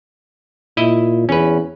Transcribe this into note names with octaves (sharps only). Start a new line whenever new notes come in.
A#2 E4 D#5
E2 C#4 B4